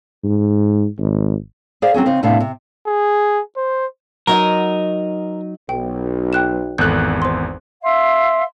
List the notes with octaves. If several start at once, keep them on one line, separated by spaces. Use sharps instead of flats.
G#2
G#1
G#4 C5 D5 F5
F#3 C4 C#4 G#4
C#3 C4 D#4
A2 C3 B3 D4 F5
C3
G#4
C5
F#3 D#4 A#4 D#5
B1 G5
G5 F#6 E7
G#1 E2 A4 F#6 G6
C5 C6
E5 F5 C6